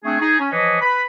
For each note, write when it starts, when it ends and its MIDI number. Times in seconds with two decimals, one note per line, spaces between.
0.05 0.19 57
0.05 0.19 60
0.05 0.19 62
0.05 0.19 68
0.21 0.38 63
0.21 0.38 68
0.40 0.48 61
0.52 0.81 52
0.52 0.81 53
0.52 0.81 71
0.52 0.81 73
0.52 0.81 75
0.81 1.03 71
0.81 1.03 83